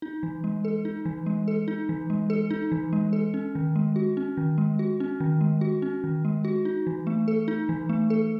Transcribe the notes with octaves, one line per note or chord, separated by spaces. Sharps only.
D#4
E3
G#3
A4
D#4
E3
G#3
A4
D#4
E3
G#3
A4
D#4
E3
G#3
A4
C#4
D#3
G#3
F#4
C#4
D#3
G#3
F#4
C#4
D#3
G#3
F#4
C#4
D#3
G#3
F#4
D#4
E3
A3
A4
D#4
E3
A3
A4